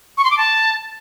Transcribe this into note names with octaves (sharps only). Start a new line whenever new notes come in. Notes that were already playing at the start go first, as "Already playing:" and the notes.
C#6
C6
D6
A5